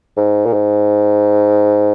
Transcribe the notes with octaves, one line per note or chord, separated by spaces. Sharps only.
G#2
A#2
G#2